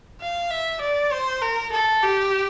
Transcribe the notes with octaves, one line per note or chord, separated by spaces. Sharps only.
F5
E5
D5
C5
A#4
A4
G4